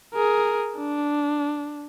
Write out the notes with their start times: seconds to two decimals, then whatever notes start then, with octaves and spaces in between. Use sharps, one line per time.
0.14 G#4 A#4
0.77 D4